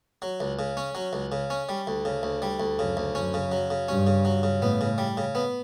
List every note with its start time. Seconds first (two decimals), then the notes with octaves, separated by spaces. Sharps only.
0.22 F#3
0.40 C#2
0.59 C#3
0.77 C#4
0.95 F#3
1.13 C#2
1.32 C#3
1.50 C#4
1.69 G3
1.87 D2
2.05 C#3
2.23 D2
2.42 G3
2.60 D2
2.79 F#2 C#3
2.97 D2
3.15 F#2 C#4
3.34 C#3
3.52 F#3
3.71 C#3
3.88 G2 C#4
4.07 C#3
4.25 F#3
4.43 C#3
4.61 A2 B3
4.81 C#3
4.98 G3
5.17 C#3
5.35 B3